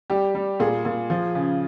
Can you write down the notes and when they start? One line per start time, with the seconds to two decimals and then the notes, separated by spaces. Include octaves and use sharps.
0.10 G3 G4
0.35 G3
0.60 A#2 G#4
0.85 A#2
1.10 F3
1.35 C#3